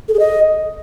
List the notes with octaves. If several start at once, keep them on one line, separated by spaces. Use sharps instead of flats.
A4
G#4
D#5